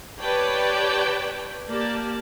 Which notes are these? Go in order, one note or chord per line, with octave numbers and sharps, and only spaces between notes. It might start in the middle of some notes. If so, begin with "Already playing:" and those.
G4 B4 C#5 D5 G5 A5
A#3 G4 D5 A5